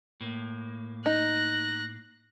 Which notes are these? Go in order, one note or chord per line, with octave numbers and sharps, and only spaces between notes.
A2 A#3
D#4 F#6 A#6